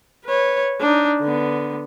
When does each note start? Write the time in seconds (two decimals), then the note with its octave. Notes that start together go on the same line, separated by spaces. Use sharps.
0.25 B4 C#5
0.81 D4 D#4
1.20 D3 B3